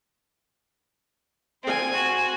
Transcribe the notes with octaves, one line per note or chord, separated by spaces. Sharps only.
C4 C5 G#5
F#4